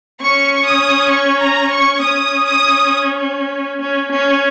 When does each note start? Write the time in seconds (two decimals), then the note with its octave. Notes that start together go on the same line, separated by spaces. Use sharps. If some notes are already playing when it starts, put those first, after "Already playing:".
0.22 C#4 C#6
0.66 D#6
1.11 C#6
1.41 A#5
1.71 C#6
2.01 C#4 D#6
2.47 D#6
3.81 C#4
4.11 C#4